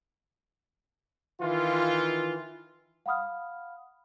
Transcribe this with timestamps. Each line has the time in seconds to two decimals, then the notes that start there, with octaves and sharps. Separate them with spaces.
1.41 D#3 E3 F4
3.06 F5 F#5 B5 D#6 F6